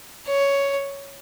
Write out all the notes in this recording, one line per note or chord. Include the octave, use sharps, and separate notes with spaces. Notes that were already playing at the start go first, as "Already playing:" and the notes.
C#5